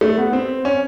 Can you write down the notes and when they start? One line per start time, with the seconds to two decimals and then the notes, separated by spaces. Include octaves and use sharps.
0.01 A3
0.18 B3
0.33 C4
0.65 C#4